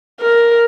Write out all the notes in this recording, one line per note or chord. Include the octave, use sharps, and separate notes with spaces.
A#4